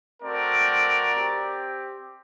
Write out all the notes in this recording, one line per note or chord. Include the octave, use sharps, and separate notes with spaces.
A3 C4 F#4 A#4 D5
C4 G4